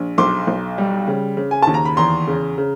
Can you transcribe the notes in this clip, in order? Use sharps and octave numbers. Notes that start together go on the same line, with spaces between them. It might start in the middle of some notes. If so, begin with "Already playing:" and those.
Already playing: A#1
B1 C6 D6
B1
G3
C#3
C#3
G#5
D#2 A5
A#5
B5
E2 A#5 C6
C#3
C#3